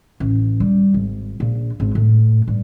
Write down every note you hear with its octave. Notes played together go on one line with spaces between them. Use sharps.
A1
G3
G#1
A#1
G#1
A2
G2